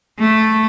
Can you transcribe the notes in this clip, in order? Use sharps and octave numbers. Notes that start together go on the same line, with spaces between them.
A3